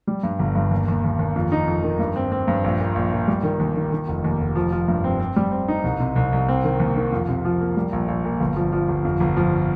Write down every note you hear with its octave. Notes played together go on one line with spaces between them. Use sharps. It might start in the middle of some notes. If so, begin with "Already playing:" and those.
G3
G2
G1
G2
D#2
D#2
D#2
D#2
F2
D#4
F2
D#3
G2
C4
C4
G2
A#1
A#2
A#1
A#2
G3
D#3
D#2
D#3
D#3
F1
D#2
F1
F3
F3
G2
C4
C4
G3
C4
D#4
C2
C3
C2
C2
C4
D#3
D#2
D#3
F2
C3
F3
A#3
G3
A#1
A#1
A#2
G1
F3
F3
G1
F2
G1
F3